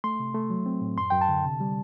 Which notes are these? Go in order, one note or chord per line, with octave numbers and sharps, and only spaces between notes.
A3 C6
C3
A3
F#3
C4
A2
F#2 C6
F#2 G5
A5
D3
C3
G3